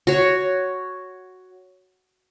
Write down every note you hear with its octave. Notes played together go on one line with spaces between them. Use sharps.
F#4 C#5